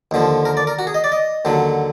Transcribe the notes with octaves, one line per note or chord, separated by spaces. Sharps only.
D#2 D3 F3
A#4
D5
A#4
F#4
G#4
D#5
D5
D#5
D#2 D3 F#3